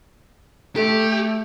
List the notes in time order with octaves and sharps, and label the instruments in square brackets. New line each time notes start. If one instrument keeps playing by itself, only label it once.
[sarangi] A3 [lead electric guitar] G4 [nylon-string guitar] A4